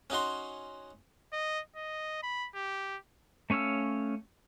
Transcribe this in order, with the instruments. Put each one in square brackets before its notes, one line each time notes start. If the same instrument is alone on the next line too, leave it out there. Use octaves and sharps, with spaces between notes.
[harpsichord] C#4 D#4 F#4 C6
[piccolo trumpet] D#5
D#5
B5
G4
[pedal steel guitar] A3 C#4 C#5 F5 E6